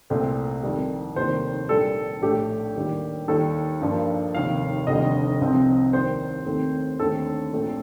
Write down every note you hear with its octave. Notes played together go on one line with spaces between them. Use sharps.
C2 A#2 A3 C4
F2 D#3 G3
F1 D#2 D#3 G3 A#3 C5
A#1 A#2 G3 A#3 A4
A#1 A2 A3 G4
D#2 D#3 G3 A#3
D#2 D#3 G3 A#3 A4
G2 F3 A#3
F1 D#2 D#3 F5
F1 D#2 D3 G3 D#5
C2 C3 F3 C4
D#2 D#3 G3 C4 C5
D#2 D#3 A3 C4
D#2 D3 A3 C4 A4
A#1 A#2 A3 C4